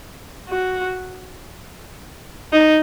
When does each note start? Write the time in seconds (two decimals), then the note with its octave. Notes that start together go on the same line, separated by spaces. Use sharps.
0.49 F#4
2.52 D#4